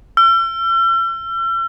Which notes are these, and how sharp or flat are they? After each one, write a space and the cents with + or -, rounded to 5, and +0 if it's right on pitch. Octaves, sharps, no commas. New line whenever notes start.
E6 +45